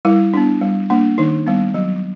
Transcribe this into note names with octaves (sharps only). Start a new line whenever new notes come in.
G3 E4
B3 D4
G3
A#3 D4
D#3 D#4
G3 B3
F#3